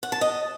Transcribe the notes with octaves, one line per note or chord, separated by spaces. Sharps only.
F#5
A5
D#5